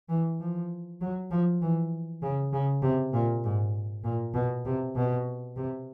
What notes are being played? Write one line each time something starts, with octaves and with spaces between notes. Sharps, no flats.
E3
F3
F#3
F3
E3
C#3
C#3
C3
A#2
G#2
A#2
B2
C3
B2
C3